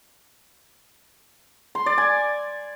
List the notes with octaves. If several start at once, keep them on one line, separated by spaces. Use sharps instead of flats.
C6
D5
G#5